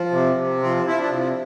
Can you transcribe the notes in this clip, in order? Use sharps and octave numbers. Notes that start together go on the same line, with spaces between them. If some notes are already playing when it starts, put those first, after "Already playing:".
Already playing: F3
C3
C3
F3 C4
F3 E4
D4
C3